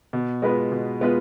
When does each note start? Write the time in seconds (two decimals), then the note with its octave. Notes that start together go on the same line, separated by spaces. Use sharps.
0.13 B2
0.42 G#3 B3 F4 B4
0.72 B2
1.01 G#3 B3 F4 B4